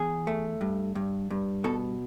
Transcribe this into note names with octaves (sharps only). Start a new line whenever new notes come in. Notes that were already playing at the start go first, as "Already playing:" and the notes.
Already playing: E2 G#4
A3
G2
G2
G2
B2 A4